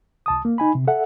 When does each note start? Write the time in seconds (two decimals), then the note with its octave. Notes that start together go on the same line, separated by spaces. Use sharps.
0.26 C2 A5 D#6
0.45 A#3
0.58 D#4 G#5 B5
0.75 C3
0.88 A4 E5 F#5